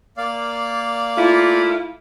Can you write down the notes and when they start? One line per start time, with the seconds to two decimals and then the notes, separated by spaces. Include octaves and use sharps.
0.17 A#3 D5 F5
1.16 A3 E4 F4